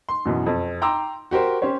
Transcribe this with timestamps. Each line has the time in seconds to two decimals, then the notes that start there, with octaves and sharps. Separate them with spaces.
0.09 C6
0.25 F#2 B2 E3
0.46 F2
0.82 G5 A#5 C6 D6 E6
1.31 F#4 G4 A#4 C5
1.62 C#4 G4 C5 C#5